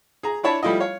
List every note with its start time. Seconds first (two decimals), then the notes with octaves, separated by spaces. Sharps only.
0.23 G#4 A#5
0.43 D4 E4 C#5 A5 B5
0.63 F3 G3 A3 E4 F4 D#5
0.80 C#5 F5